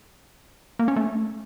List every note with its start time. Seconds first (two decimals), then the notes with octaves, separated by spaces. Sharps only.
0.79 A#3
0.88 C#4
0.96 A3